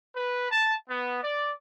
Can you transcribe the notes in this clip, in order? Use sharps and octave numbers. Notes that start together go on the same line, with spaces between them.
B4
A5
B3
D5